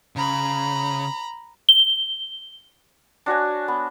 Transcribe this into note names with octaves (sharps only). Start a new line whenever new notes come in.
C#3 A#5 B5
G7
D4 F#4 C#5 G#5
B3